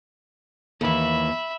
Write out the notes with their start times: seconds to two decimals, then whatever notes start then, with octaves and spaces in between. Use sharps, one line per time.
0.81 D#2 E3 E5 B5